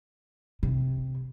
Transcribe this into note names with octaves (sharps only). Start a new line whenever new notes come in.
C3